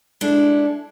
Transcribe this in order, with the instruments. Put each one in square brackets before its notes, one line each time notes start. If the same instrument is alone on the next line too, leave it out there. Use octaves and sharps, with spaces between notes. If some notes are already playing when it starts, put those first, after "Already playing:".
[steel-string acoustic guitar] G#3 D4 E4 A4